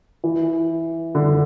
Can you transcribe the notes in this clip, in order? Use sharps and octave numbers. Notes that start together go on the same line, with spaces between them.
E3
D3